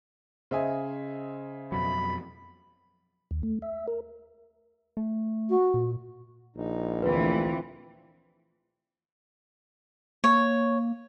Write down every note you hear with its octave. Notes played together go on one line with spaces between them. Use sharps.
C#3 C5 D#5 E5 G#5
F2 B2 F#3 B5
D#2
A3
E5
A#4
A3
F#4
A#2
A#1 D#4
D2 E3 C4 F4 B4
A#3 C#5